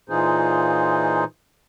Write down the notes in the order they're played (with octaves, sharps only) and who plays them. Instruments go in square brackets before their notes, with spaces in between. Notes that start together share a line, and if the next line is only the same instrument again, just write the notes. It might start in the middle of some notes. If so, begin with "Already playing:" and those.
[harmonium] A#2 E3 D#4 F4 G#4 C5